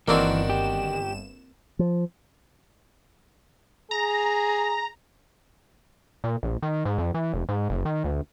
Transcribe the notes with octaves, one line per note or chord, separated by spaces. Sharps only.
G1 D#3 E3 A#3 C4 D4 F#4 E7
G4
F3
G#4 A#5
A#2
A#1
D#3
G#2
F2
E3
F1
G#2
F#1
D#3
D2